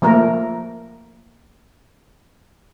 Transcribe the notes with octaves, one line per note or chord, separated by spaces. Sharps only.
F3 A3 A#3 A#4